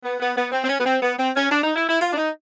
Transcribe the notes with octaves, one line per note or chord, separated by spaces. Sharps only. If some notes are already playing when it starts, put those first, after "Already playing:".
B3
B3
B3
C4
C4
C#4
B3
C4
B3
C4
C#4
D4
D#4
E4
E4
F4
D4
D#4